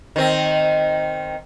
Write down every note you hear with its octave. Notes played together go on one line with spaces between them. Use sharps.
D#3 C4